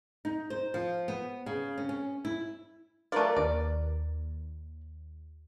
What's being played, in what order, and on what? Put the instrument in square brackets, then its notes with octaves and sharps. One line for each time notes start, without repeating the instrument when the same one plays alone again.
[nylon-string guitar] D#4
C5
F3
B3
C#3
C#4
C#4
E4
[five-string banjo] A3 F4 [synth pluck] A#4 B4 D5
[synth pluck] D#2 [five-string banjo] D5